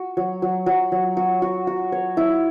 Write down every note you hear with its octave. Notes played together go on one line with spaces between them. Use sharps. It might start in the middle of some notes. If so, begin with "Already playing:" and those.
Already playing: F#4
F#3
F#3
F#3
F#3
F#4
F#4
F#4
C#5
E4